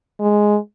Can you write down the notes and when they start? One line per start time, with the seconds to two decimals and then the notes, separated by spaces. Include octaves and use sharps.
0.19 G#3